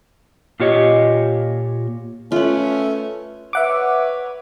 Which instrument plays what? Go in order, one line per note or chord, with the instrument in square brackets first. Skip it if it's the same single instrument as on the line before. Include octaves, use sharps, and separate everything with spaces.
[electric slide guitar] A#2 F4 G4 C#5 D#5
[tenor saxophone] A3 [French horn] C#4 [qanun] F4 B4
[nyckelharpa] B4 C#5 [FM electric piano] E5 F#5 D6